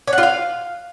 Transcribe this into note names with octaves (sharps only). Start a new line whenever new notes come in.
C#5
F#5
F4
F5